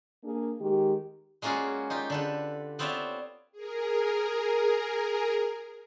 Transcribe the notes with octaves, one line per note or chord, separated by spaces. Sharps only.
A#3 D4 G#4
D#3 G#3 G4
G#3 A#3 C#4 F4 F#4 G#4
D#4 F4 G4
D3 A4 B4
B3 C4 F4 C#5 D5 E5
G#4 A#4